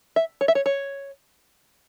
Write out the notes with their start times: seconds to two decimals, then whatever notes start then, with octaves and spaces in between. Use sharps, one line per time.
0.16 E5
0.41 C#5
0.48 E5
0.55 C#5
0.66 C#5